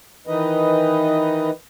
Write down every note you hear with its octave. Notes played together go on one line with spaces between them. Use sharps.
D#3 E3 D#4 B4 D#5